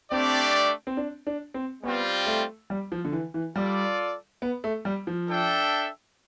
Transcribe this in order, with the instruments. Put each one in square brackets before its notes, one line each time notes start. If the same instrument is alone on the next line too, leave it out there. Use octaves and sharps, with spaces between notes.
[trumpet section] A3 D4 G4 D5 [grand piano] C4
[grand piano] C4
D4
D4
C4
[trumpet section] G3 C4 F4 [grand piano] B3
[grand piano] A3
G3
F3
D3
E3
E3
[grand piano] G3 [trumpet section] F4 A4 D5
[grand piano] B3
A3
G3
F3
[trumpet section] D4 A4 E5 G5